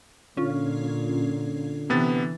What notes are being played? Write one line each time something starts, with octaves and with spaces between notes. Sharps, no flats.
A#2 D3 C#4 F4
C3 E3 B3 A6